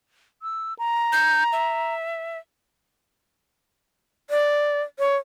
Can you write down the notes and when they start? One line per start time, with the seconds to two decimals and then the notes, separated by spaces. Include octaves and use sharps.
0.42 E6
0.79 A#5
1.13 G6
1.53 E5
4.30 D5
4.99 C#5